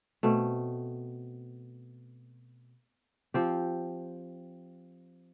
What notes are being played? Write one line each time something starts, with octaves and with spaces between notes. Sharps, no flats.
B2 A3 C4
F3 C4 G4